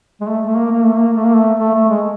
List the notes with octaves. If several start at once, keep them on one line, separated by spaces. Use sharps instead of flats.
G#3
A3
A3
A#3
A#3
A3
A#3
A3
A#3
A3
A3
A3
G#3